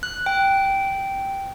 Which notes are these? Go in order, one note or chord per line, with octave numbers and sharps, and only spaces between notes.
F#6
G5